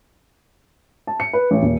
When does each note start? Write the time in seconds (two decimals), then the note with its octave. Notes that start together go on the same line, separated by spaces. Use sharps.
1.07 A5
1.20 C#7
1.33 B4
1.51 A1
1.63 D#1